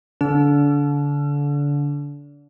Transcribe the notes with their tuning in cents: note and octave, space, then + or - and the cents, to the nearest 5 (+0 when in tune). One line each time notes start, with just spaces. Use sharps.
D3 -30 E6 +35